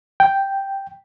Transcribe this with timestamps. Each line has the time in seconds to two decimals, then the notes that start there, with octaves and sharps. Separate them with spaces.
0.20 G5